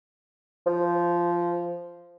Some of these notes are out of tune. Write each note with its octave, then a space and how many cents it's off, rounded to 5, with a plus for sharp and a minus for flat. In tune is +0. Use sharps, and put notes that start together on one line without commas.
F3 -10